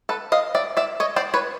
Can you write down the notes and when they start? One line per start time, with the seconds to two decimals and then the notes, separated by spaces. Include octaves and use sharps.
0.09 A4 B4
0.32 D#5 F5
0.55 D5 E5
0.77 D5 E5
1.00 C#5 D#5
1.16 C5 D5
1.34 B4 C#5